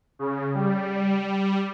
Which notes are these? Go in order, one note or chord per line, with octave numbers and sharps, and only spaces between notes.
C#3
G3